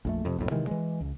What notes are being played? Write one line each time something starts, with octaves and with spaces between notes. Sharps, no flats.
A#1 F2 A3
F2 C3
B1 F2 A2
C3 D#3 E3 G#3
E3 F#3 G#3
C#2